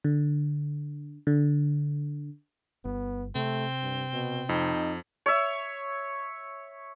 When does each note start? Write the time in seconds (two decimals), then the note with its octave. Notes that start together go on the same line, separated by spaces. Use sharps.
0.04 D3
1.27 D3
2.85 G1 B3
3.35 C3 A3 C4
3.83 G2
4.13 B2
4.49 F2 D#4
5.26 C#5 E5